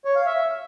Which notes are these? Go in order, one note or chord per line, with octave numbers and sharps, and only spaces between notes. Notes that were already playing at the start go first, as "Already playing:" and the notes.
C#5
F5
E5